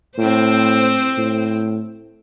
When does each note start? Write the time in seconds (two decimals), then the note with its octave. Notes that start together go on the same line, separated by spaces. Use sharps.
0.18 A2 C4 C5
1.17 A2